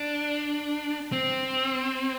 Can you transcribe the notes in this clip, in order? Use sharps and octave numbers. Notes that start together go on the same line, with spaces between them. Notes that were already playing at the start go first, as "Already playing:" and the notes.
Already playing: D4
C4